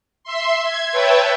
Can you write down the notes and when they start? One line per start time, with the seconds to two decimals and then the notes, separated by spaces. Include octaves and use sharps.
0.24 E5 C6
0.64 G#6
0.92 B4 C#5 E5 G5 A5